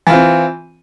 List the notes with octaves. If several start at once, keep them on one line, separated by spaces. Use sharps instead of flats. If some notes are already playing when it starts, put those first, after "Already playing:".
E3 C4 F4